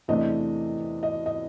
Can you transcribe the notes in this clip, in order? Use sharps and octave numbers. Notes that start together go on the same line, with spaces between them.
E2 C3 E3 A3 D4 D#5
D#5
D#5